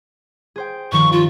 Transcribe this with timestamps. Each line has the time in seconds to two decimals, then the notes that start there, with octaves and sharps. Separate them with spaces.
0.56 G#4 C5 G5
0.92 G2 D#3 F3 C#6
1.12 F4